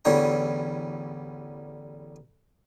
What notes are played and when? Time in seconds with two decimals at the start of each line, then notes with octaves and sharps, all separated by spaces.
0.05 A1 E2 D3 G3 C#5 A#5